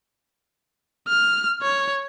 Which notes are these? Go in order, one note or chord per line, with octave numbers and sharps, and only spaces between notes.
F6
C#5